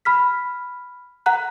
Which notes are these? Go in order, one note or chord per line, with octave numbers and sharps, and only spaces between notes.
B5 F6 B6
F#5 A#5 F#6